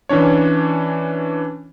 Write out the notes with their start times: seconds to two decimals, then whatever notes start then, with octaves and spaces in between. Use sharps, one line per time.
0.09 E3 C#4 D4 C#5